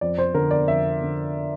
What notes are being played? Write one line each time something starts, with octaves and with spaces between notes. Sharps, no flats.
F2 D5
C5
D3 A#4
D5
F2 E5
D3